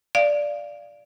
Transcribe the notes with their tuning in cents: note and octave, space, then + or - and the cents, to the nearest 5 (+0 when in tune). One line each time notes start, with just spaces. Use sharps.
D5 -5 F5 -10